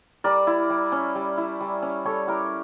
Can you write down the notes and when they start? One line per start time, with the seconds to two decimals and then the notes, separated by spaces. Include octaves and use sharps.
0.24 G3 A#4 D5
0.47 E4
0.70 G3
0.92 C#4
1.15 G3
1.38 E4
1.61 G3
1.82 C#4
2.05 G3 A4 C#5
2.28 E4 G4 A#4